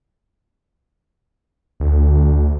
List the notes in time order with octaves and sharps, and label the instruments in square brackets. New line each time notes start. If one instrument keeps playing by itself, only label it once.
[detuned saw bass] D2